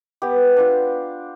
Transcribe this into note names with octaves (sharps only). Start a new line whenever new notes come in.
B3 G4
D4 F4